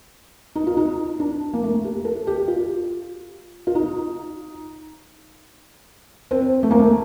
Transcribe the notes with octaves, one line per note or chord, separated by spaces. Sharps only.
D#4
F4
D#4
D4
A#3
A3
G4
A4
G4
F4
F4
D#4
C4
A3
A#3
A3